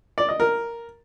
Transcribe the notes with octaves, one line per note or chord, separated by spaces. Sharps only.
D5
D#5
A#4